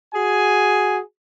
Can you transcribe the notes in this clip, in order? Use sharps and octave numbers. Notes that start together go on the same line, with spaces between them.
F#4 G#4 G#5